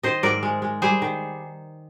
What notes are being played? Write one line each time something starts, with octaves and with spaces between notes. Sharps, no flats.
D#3 C5 D#5
G#2 A#4 D5
G#3
G#3
G3 G#4 C5
D#3